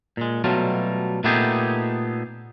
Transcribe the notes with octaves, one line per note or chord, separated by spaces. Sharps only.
A#2 G#3
B2 F#3 G3 A3 F4
A#2 A3 B3 D#4 G4 G#4